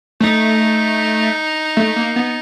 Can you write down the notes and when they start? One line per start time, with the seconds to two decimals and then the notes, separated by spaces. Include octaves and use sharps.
0.20 A3 D#4
1.77 A3
1.96 A#3
2.16 B3